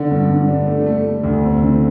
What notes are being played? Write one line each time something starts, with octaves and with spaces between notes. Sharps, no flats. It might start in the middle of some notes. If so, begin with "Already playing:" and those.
Already playing: D3
G2
G2
G3
A3
A3
A3
D2
C4
D3